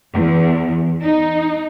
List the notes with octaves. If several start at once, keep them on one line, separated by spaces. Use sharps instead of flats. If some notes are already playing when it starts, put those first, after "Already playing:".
E2
D#4